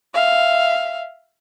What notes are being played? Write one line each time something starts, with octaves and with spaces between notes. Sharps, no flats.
E5 F5